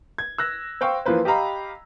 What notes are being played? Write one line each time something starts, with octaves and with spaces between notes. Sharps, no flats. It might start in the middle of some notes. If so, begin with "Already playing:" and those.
G#6
E6 F#6 A#6
C5 F5 G5 C#6
E3 F3 A#3 B4 C5
G4 D#5 F5 A#5 B5